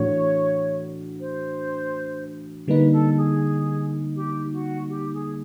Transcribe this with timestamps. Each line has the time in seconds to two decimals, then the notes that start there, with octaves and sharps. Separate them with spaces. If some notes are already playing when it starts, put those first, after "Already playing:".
Already playing: A2 E3 A3 D4 F#4 C#5
1.20 C5
2.67 D3 G3 A#3 D#4 B4
2.92 A4
3.17 G#4
4.15 G4
4.51 F#4
4.88 G4
5.13 G#4